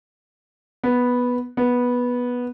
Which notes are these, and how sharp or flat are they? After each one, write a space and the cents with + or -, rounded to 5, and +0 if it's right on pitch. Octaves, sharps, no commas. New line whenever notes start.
B3 -5
B3 -10